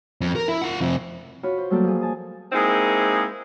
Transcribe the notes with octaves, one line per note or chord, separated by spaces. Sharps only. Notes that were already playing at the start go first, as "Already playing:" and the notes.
F2
A#4
E4
F4 F#5
F2 C3
F4 F#4 C#5 B5
C5
F#3 G3 A3 A#3 G4 A4
F3 G#4
G#5 A5 D#6
G#3 A#3 C4 D#4 E4 G#4